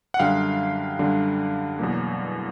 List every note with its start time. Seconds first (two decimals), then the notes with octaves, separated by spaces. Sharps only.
0.14 F#5
0.19 F#2 D3 G3 F5 G5
0.99 F#2 D3 G3
1.79 E2 B2 F#3 A#3